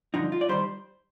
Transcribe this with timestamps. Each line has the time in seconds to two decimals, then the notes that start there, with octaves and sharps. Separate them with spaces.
0.14 G2 D3 F3 D#4
0.32 F4
0.41 D5
0.49 D#3 G3 C5